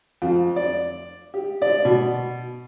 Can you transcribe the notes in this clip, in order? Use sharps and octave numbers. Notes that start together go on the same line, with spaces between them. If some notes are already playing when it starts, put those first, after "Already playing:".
F2
D5
G4
D5
B2